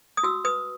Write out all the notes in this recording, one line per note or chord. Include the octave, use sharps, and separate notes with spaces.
D#6
F#4 E6
B4 D#6